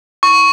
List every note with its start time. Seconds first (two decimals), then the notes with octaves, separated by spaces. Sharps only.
0.23 C#6